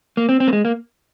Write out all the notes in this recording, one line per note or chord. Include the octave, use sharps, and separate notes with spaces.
A#3
C4
C4
A#3
G#3
A#3